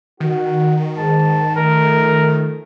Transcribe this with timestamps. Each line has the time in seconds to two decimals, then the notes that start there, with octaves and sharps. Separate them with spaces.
0.20 D#3 F#4
0.98 G#2 A5
1.56 F3 A3 A#4